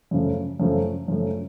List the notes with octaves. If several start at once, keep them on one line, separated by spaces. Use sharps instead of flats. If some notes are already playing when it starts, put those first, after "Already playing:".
F#2 C#3 F3 A3
F#2 C#3 F3 A3
F#2 C#3 F3 A3